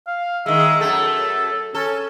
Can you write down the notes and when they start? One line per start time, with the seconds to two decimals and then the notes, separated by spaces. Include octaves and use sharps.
0.07 F5
0.46 D#3 G#3 E5
0.81 F#2 A3 A4
1.75 C#4 A4